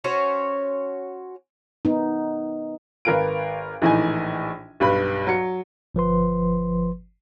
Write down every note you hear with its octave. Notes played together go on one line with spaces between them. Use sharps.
C#4 F#4 C5 C#5
B3 D#4
G#1 A#4 B4 F5 D7
A#1 A2 E3 D#4 D#5 G#5
B1 G2 B4 B5
F#3 C#7
G1 F3 B4 C6